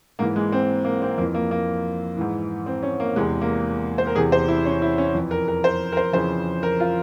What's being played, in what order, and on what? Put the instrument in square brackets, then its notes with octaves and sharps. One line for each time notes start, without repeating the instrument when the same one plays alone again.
[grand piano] G#2 E3 A#3
G#3
C4
A#3
C4
F2 E3 A#3
A#3
A#3
G#2 E3
C4
C#4
A#3
E2 C3 E3 G#3
A#3
C5
A#4
E2 C3 E3 G#4
C5
E4
C#4
E4
C#4
F2 E3
A#4
A#4
C5
A#4
C5
F2 C#3 E3 C5
A#4
F4